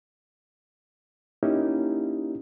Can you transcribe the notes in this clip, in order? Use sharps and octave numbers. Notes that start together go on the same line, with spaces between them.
A#3 C#4 D#4 E4 G4